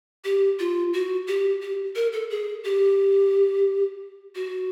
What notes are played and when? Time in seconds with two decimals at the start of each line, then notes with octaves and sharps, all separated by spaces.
0.24 G4
0.59 F4
0.93 F#4
1.27 G4
1.62 G4
1.95 A#4
2.13 A4
2.30 G#4
2.64 G4
4.35 F#4